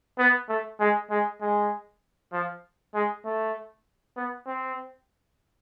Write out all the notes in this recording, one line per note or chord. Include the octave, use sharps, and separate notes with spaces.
B3
A3
G#3
G#3
G#3
F3
G#3
A3
B3
C4